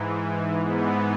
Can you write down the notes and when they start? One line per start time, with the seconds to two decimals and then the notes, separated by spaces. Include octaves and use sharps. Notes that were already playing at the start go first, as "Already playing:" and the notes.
Already playing: G#2 E3
0.61 G#2 E3 B3